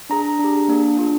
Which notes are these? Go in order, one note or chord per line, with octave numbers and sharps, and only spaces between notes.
D4 G#4 A#5
D4
G4
A#3 D4 G#4
D4 F4 G#4